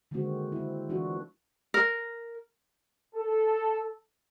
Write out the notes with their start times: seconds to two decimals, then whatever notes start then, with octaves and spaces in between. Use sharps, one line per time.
0.11 D3 D#3 G#3 A#3 C4 F#4
0.52 C4 E4
0.89 E3 D4 F4 F#4
1.74 A#4
3.16 A4